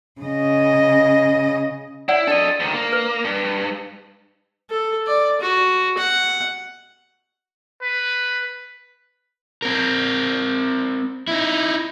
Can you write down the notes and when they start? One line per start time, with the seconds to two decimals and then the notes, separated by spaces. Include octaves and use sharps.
0.21 C#3 D#5
2.08 E4 C#5 D5 F#5
2.27 D4 A4 D5 D#5
2.60 D2 D#3
2.74 A#3
2.93 B4
3.25 G2
4.70 A4
5.07 D5
5.41 F#4
5.98 F#5
7.82 B4
9.62 C4 A#4
11.28 D#4 E4